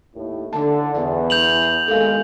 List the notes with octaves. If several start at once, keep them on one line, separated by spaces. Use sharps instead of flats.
D#2 A2
D3 A5
E2 F#5
G6 F7 F#7
D#2 G#3 A4 A#4 F5